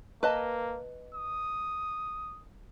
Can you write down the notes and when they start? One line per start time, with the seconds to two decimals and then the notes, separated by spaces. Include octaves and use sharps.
0.23 A#3 B4 D#5 A5
1.14 D#6